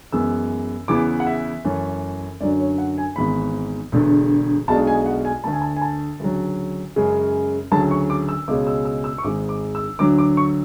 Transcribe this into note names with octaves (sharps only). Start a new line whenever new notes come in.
F#2 E3 G#3 B3 E6
E2 C#3 E3 B3 E4 D6
F#5
E5
F#2 E3 A3 C#4
F#2 D3 F#3 D5
C#5
F#5
G#5
G#1 G#2 E3 B3 B5
E1 E2 D3 A3
B1 B2 G#3 D4 A5
G#5
F#5
G#5
D2 D3 A3 A5
G#5
A5
G#5
A5
D2 C#3 F#3
F#2 C#3 G#3
D2 C#3 F#3 A3 A5
C#6
D6
E6
C#2 B2 G#3 C#4 D6
E6
E6
E6
C#6
G#1 G#2 G#3 D6
D6
E6
D2 D3 F#3 D6
D6
C#6